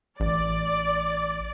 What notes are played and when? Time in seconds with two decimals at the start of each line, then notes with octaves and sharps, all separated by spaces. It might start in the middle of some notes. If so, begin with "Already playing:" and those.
0.20 A1 D5